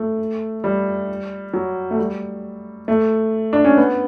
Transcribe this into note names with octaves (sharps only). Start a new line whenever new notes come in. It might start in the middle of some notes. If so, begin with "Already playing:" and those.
Already playing: A3
G3
F#3
A3
G3
A3
D4
C#4
B3